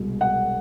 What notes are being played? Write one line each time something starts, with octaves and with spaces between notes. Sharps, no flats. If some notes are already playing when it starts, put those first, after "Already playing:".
Already playing: C2 B2 G#3
F#5